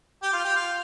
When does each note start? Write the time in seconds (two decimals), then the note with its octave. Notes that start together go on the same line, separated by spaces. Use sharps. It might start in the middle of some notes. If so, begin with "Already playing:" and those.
0.22 G4 G5
0.33 F4 F5
0.44 G4 G5
0.56 F4 F5